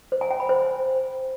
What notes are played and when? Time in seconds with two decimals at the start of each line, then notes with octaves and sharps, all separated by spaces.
0.12 C5
0.21 G#5
0.31 G5
0.40 B5
0.49 C5